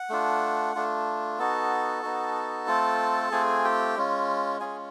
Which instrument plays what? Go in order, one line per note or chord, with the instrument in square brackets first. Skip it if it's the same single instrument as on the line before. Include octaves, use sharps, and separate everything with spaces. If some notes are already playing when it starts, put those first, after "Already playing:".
Already playing: [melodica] F#5
A3 D4 F4
A3 D4 F4
B3 D#4 F#4 A4 A5
B3 D#4 F#4
A3 C4 F4
A3 C4 F4 G#4 G#5
G4 G5
G#3 C#4 F4
G#3 C#4 F4 G#4 G#5